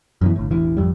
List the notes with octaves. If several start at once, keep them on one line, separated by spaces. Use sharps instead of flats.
F#2 B2 E3
G1 A2
E1 A1 E3
G#1 F2 G3